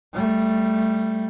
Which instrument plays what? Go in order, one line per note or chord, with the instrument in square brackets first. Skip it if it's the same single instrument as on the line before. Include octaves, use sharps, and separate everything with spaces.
[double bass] G3 A3